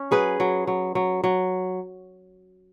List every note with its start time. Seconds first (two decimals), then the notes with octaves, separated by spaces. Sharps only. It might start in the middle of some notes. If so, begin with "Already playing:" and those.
Already playing: C#4
0.11 F#3 G#4 B4
0.40 F#3
0.67 F#3
0.95 F#3
1.24 F#3